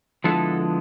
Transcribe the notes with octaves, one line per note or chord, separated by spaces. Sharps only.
D3 F3 G#3 B3 E4 A4